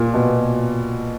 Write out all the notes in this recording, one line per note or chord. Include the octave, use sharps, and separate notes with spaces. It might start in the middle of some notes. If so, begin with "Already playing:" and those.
Already playing: A#2
B2